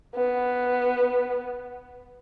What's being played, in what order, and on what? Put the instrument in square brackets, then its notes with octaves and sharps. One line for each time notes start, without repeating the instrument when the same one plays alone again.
[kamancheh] B3